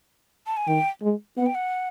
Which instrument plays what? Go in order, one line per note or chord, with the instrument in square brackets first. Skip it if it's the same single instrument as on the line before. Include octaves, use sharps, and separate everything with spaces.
[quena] A5
G#5
[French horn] D#3 [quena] G5
[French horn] G#3
[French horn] B3 [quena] F#5
[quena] G5
F#5